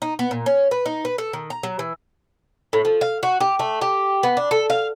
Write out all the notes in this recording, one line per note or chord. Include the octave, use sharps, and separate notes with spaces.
D#4
B3
A#2
C#4
B4
D#4
B4
A4
D#3
A#5
F#3
E3
A2
F3
F5
F#4
G4
A3
G4
B3
D4
A4
F5